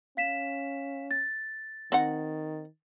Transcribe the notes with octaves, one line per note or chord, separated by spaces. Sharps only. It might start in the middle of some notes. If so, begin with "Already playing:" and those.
C#4 F5 B6 E7
A6
D#3 C4 D#4 F#5